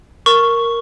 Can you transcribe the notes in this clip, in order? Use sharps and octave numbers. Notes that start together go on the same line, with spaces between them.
A#4 C#6